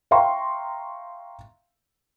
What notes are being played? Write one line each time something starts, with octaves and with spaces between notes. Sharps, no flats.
E5 F5 G5 A#5 C6 C#6